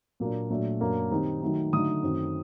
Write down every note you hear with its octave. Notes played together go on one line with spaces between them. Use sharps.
A#2 F#3 A#3 D4
A#2 F#3 A3 D4
F#2 F#3 A#3 D4
D#3 G3 C4 D#4
D#3 F#3 A3 D#4
D3 F#3 A3 D#4 D#6
F#2 D#3 A3 C4